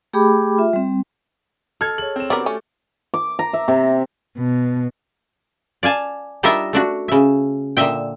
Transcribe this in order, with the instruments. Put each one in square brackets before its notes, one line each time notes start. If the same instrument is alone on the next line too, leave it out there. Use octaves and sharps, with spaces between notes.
[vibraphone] A3 G4 G#4 G5 B5 D6
F4 E5
G3 C4
[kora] A4 [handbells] D#5 A5 D#6 [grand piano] F6 G#6
[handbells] G#4 C#5 [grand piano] F#7
[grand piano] C4 E7
[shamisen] D3 B3 A#4 [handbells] F#4 G4 [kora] D5
[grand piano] A3 [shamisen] C#4
[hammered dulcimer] D6
A#5
E5
C3
[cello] B2
[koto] D5 F5 G#5 A5
G3 D4 D#4 F4 A#4 E5
A3 D4 F#4
C#3 E5
A#2 D3 D#5 E5 G5